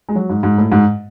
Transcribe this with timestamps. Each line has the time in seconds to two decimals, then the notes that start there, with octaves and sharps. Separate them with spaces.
0.09 G#3
0.15 F#3
0.30 G#2
0.43 G#2
0.58 A2
0.72 G#2